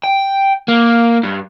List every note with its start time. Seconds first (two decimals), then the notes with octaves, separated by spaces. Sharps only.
0.04 G5
0.68 A#3
1.24 G2